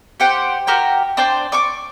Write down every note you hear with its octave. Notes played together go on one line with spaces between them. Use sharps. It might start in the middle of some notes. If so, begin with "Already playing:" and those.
G4 C5 F#5 G5
F#4 G4 A#4 G5
D4 C5 D5 G5
D5 C#6 D6